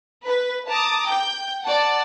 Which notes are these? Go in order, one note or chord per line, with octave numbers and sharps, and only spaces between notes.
B4
A5 A#5 D6 D#6
G5 G6
D5 F#5 A5